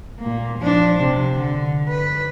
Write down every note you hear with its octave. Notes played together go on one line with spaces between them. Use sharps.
A#2 A#3
F3 D4
C3
D3
B4